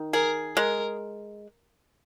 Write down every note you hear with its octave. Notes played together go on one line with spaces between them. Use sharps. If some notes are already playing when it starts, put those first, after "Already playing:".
Already playing: D#3
G#4 A#4
G#3 A#4